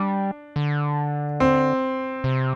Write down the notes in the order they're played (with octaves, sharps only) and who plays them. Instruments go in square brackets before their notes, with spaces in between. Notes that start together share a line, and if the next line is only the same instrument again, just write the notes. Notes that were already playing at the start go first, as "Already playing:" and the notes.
Already playing: [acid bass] G3 [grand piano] D4
[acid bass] D3
[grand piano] C4
[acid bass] C3